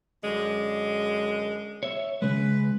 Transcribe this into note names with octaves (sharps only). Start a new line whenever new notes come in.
F#2 D3 G#3
C#5 E5
C#3 G#3 B4